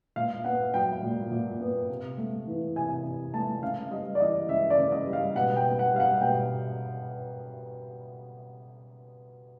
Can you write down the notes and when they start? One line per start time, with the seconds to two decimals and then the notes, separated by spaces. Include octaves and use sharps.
0.16 A#2 F5
0.44 B3 F#5
0.74 F#3 G5
1.03 A#2
1.32 A#2
1.60 B3
1.89 C3
2.18 A3
2.47 E3
2.75 C3 G#5
3.05 C3
3.34 A3 A5
3.63 C#3 F5
3.91 G3 D#5
4.15 D5
4.20 E3 D#5
4.49 C#3 E5
4.70 D5
4.78 C#3
4.92 D#5
5.06 G3
5.13 F5
5.35 B2 F#5
5.56 G5
5.64 B3
5.79 F#5
5.93 G3 F5
6.00 F#5
6.21 B2 G5